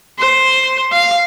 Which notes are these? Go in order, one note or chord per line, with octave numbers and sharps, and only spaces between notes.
C5
F5